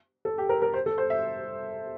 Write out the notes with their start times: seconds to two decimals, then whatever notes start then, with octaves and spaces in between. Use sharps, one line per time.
0.25 A4
0.38 G4
0.49 A#4
0.62 A#4
0.74 C5
0.86 A4
0.98 C5
1.10 E5